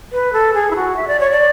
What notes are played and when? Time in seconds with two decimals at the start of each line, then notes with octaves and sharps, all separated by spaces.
0.12 B4
0.33 A4
0.54 G#4
0.71 E4
0.76 F#4
0.97 E5
1.07 D5
1.20 C#5
1.31 D5